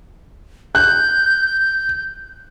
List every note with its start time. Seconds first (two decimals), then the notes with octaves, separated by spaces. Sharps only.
0.75 F#6 G6